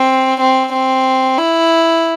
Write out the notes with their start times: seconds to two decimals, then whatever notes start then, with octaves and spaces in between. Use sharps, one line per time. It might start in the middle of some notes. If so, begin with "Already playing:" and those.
Already playing: C4
0.40 C4
0.73 C4
1.38 E4